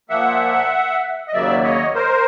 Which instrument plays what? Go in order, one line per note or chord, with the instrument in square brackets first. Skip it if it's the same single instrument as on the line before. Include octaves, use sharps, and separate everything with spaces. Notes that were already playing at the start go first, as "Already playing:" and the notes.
[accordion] A#2 F3 A#3 E5 F#5
D#5
D#2 C#3 F#3 A#3 D5 E5
C#5 D#5
A#4 C5